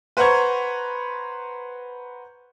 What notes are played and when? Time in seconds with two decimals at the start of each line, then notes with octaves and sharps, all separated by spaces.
0.17 B4 C5 F#5 A#5 C#6 G#6